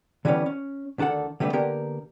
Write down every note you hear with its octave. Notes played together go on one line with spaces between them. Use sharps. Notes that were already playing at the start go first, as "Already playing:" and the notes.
D3 E3 G3 A#3 B3 C#4
C#4
D2 D#3 D4 A4 F#5
D3 G3 A3 B3 D4
D3 A#3 B3 G4 A#4